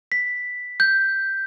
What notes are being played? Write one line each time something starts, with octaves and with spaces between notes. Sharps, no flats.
B6
G6